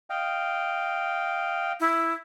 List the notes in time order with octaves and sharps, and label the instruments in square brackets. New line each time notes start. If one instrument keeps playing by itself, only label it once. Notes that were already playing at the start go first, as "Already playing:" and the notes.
[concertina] D#5 F5 G5
[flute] E4